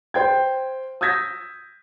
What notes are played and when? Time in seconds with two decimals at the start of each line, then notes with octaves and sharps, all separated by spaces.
0.14 C5 G5 G#6
1.01 D#6 E6 G6 G#6 A#6 B6